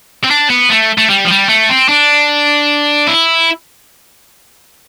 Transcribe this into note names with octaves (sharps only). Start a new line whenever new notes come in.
C4
D4
B3
A3
A3
G3
F3
G3
A3
C4
D4
E4